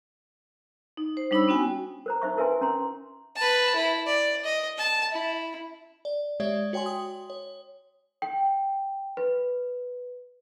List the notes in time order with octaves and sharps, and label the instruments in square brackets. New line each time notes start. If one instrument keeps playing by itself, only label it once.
[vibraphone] D#4
C5
G3 D4 D#4 C#5 B5 E6
B3 C#4 F#4 G5 G#5
[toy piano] A#4 C5 A#5
D#4 C5 E5 C#6
E4 A#4 B4 E5 G#5 C6
C#4 A#5 C6
[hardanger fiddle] B4 A5
E4
D5
D#5
A5
E4
[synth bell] D5
G#3 G4 C#5 D5 E5
F#4 C#5 G5 G#5 C6
D#6
C#5
[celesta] G5
B4